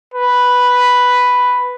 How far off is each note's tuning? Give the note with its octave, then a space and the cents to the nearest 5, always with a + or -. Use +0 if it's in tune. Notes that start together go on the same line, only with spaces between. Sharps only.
B4 +0